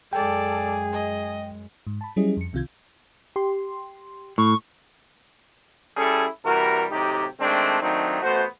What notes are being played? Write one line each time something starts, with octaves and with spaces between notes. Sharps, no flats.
F#2 G#3 G#4 A4 D5 G5
D#5
G#2
A5 B5
F#3 G3 C#4 E4 G#4 D#5
F2 C#7
C2 C3 D#3 F4 G6 G#6
G4 C6
A2 C#6
G3 C#4 E4 G#4 A4
C3 E3 G3 F#4 A#4
A2 C3 F#3 D#4 G4
D#3 G#3 A3 C4 D4
D#3 F#3 A3 C4 D4 D#4
A1 A3 B3 F#4 C5